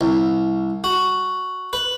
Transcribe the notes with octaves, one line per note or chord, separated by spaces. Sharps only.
C2
F#4
B4